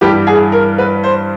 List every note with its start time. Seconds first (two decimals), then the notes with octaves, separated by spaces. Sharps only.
0.01 G2 E3 G3 G4
0.27 G#4
0.52 A#4
0.78 B4
1.04 C5